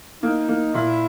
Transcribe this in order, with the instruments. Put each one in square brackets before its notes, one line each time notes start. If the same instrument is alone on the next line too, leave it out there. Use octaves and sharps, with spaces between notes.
[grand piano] A#3 [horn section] D#4
[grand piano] A#3
[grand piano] A#2 [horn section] E4